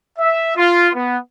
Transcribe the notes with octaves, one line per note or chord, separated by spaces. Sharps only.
E5
F4
B3